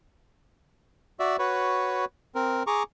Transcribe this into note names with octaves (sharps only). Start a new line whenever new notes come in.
F#4 D5 E5
F#4 B4 C#5
C4 A#4
G#4 A#5 C#6 D6